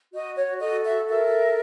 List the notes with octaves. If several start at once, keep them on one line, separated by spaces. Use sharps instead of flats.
F#4 D#5
C#5
A4 D#5
E5
A#4 E5